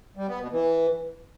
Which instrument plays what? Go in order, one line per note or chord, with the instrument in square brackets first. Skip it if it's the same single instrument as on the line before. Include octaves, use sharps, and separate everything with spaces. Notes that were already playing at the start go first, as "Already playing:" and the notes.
[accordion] G3
B3
B2
E3